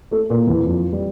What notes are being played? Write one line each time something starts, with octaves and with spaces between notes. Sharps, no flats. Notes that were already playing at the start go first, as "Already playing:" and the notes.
A3 A4
A#2 A#3
E2 E3
F2 F3
G3